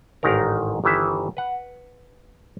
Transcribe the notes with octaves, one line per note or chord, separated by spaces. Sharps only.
A1 G#2 D#3 D4 A#4
G1 D#3 E3 E5
B4 F#5